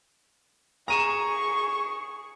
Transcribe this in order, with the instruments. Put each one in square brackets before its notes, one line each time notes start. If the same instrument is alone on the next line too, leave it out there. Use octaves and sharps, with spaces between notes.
[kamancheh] G#4 C#6 [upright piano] A#5 D#7 E7